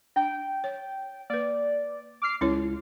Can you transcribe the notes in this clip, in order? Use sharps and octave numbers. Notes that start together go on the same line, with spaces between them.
D4 G5
C#5
A#3 B4 D5
D6 F6 C7
C#2 C#4 E4 C#5